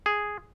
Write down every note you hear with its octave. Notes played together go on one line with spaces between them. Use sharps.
G#4